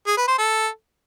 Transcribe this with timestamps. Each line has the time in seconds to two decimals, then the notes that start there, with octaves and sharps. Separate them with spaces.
0.07 G#4
0.17 B4
0.28 C5
0.38 A4